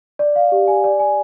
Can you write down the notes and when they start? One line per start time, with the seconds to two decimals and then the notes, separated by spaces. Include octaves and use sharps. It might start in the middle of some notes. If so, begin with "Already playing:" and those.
0.19 D5
0.36 F5
0.52 G4
0.68 G#5
0.84 D5
1.00 G#5